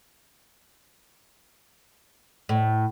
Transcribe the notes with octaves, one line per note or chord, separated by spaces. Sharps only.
A2